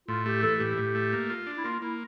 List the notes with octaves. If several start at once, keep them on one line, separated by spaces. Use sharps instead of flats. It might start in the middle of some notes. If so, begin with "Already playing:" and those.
A2 F4
A3 G4
E3 A4
A2 G4
A2
A3
A#3
F4
D4
E4
A#3 F4
A#3 E4